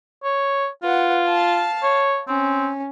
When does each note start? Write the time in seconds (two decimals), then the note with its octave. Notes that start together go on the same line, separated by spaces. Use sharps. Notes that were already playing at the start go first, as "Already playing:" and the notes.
0.24 C#5
0.83 F4 B4 F#5
1.26 F5 A5
1.83 C#5
2.28 C4 C#4